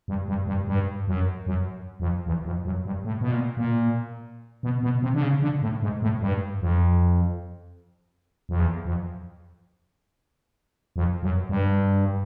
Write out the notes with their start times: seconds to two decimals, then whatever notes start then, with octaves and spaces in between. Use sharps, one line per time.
0.08 G2
0.28 G2
0.47 G2
0.67 G2
1.08 F#2
1.47 F#2
2.00 F2
2.26 E2
2.46 F2
2.65 F#2
2.85 G2
3.04 A2
3.21 B2
3.31 A#2
3.57 A#2
4.63 B2
4.83 B2
5.02 C3
5.14 D3
5.22 C#3
5.42 D3
5.62 A2
5.82 G#2
6.02 A2
6.21 G2
6.61 F2
8.49 F2
8.59 E2
8.85 F2
10.96 F2
11.22 F#2
11.49 G2